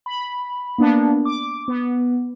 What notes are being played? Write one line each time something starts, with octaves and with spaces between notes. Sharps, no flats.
B5
A#3 B3 D4
D6
B3